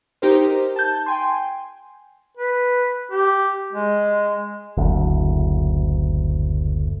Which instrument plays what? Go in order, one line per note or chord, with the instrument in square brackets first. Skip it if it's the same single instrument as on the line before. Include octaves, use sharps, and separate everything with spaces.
[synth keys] D#4 G4 A#4 C5
A5 G6
G5 G#5 C6
[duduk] B4
G4
G#3
[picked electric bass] F#1 D2